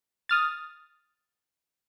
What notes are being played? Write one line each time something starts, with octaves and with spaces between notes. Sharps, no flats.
D#6 F6 A6